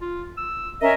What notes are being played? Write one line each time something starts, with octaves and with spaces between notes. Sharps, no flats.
F4
E6
C#4 A#4 D#5 E5